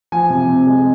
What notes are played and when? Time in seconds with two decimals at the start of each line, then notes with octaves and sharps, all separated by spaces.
0.12 F3 G#5
0.30 C3
0.49 C4
0.67 G#3